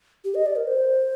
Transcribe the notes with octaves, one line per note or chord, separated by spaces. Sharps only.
G4
D#5
D5
A#4
C5